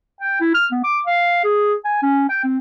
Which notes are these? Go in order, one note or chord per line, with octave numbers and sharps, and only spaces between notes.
G5
E4
F6
B3
D6
F5
G#4
G#5
C#4
G5
C4